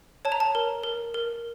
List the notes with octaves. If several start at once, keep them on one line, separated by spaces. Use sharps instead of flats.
C#5 A5
A#5
A5
A#4
A#4
A#4